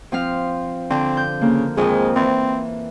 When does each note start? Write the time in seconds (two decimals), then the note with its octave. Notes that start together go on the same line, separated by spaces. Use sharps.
0.12 F3 C4 F5
0.90 D3 C4
1.17 G6
1.41 C#3 A#3
1.77 F2 D#3 G#3
2.16 E3 C4